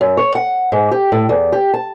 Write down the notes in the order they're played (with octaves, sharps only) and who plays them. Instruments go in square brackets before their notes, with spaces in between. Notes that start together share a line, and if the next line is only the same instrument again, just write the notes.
[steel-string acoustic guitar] F#2
C#5
F#5
G#2
G4
A2
E2
G4
A5